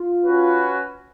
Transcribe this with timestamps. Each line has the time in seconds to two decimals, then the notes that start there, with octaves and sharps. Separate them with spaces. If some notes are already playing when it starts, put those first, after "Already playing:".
Already playing: F4
0.22 C#4 F#4 B4